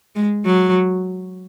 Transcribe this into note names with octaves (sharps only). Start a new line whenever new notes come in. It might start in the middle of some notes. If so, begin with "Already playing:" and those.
G#3
F#3